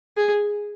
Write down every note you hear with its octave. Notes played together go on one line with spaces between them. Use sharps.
G#4